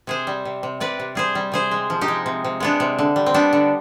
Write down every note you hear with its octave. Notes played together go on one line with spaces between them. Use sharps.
C3 G#4 C5
G3
C3
C3
C3 B4 D5
C3
G3 G#4 C5
G3
C3 G#4 C5
G#3
F3
D#4 G4
G#3
C3
C3
G#3 B3 D4
C3
D3
G3
C4
G3 B3 D4
D3